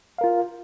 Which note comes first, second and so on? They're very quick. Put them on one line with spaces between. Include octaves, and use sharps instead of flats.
F5 A#4 F4